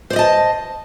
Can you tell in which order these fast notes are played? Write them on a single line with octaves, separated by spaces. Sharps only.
C5 D5 D#5 A5